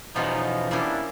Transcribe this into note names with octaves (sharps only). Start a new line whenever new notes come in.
E2 B2 F3 F#3 B3 C#4 D#4 F4
G3 A#3 B3 C#4 D4 E4